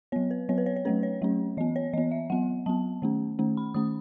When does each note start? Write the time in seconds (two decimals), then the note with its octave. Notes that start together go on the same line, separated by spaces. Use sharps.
0.12 F#3 B3 C#5
0.31 B4
0.49 F#3 B3 C#5
0.58 B4
0.66 C#5
0.76 C#5
0.85 F#3 A3 C#4 B4
1.03 C#5
1.22 F#3 A3 C#4
1.57 E3 D#5
1.61 B3
1.76 C#5
1.93 E3 D#5
1.98 B3
2.11 E5
2.30 F#3 B3 F#5
2.66 F#3 B3 A5
3.02 D#3 A3 C#4
3.39 D#3 A3 C#4
3.57 B5
3.74 D#3 A3 C#4 D#6